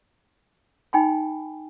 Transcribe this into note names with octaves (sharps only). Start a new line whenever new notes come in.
D#4 G5 G#5 B5